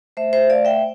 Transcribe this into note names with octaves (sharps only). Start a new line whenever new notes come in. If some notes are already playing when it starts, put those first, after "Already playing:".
A3 C5 E5
C5 E5
A3 D5 F5
E5 G5